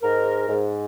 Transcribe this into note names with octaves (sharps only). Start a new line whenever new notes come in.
G#2 A#4
G#2